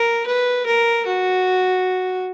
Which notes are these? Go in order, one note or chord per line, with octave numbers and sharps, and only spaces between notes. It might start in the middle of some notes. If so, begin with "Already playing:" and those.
Already playing: A#4
B4
A#4
F#4